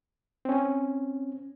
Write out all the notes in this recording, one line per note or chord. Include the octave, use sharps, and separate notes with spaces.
C4 C#4